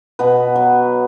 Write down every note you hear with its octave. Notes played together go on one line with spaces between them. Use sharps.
B2 B3 B4
F#3